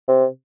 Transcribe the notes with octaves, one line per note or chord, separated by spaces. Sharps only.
C3